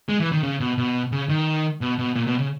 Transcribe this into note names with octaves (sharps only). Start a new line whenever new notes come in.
G#3
E3
D#3
C#3
B2
B2
C#3
D#3
B2
B2
A#2
B2
C#3